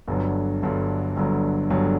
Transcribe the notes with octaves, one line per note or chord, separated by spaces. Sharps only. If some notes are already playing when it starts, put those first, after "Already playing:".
G1 G2 D3 F#3
G1 G2 D3 F#3
G1 G2 D3 F#3
G1 G2 D3 F#3